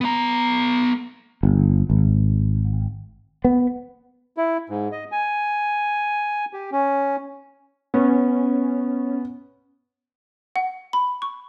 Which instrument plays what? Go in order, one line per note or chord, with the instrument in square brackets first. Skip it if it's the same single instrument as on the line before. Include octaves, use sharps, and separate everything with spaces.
[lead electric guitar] B3 A#5
[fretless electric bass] G1
G#1
B3
[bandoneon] E4
G#2
D#5
G#5
G4
C#4
[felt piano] B3 [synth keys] C#4
[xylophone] F#5
B5
C#6